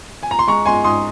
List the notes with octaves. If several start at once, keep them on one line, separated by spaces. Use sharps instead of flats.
G#5
A#5
C6
G#3 A#5 C#6
G#3 G#5 C6
G#2 C6 D#6